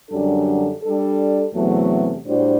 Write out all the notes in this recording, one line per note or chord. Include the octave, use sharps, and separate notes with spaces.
F#2 D3 G3 D4 A4
G3 D4 A4
E2 C3 F#3 A3
A2 G3 D4 F#4 C5